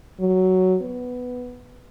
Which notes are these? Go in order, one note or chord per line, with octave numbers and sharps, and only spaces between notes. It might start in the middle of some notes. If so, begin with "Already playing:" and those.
F#3
B3